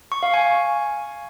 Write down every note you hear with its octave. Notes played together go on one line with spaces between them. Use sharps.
C#6
F5
G#5